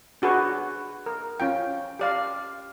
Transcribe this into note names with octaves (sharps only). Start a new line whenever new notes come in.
D4 F#4 G#4 B4 C#6
A#4
C#4 F4 G5
G4 D5 F5